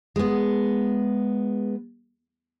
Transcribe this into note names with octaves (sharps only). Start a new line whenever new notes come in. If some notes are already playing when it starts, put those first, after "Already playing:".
G#3 B3